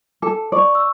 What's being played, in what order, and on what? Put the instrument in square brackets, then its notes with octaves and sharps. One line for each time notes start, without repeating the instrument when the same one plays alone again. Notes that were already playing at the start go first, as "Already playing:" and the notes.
[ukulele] A4 [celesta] D6
[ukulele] D5 [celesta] C#6
[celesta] E6